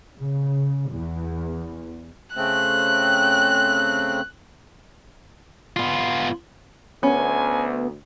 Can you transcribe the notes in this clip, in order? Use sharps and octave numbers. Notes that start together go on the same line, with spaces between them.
C#3
E2
C#3 A3 C4 F#6
B3 F4
D2 B3 C#4 G#5